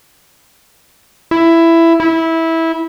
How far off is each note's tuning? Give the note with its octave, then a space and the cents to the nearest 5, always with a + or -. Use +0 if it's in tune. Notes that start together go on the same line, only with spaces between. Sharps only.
E4 +10
E4 -15